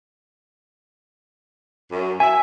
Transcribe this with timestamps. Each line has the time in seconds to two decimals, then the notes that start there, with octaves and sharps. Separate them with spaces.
1.91 F#2
2.20 E5 G#5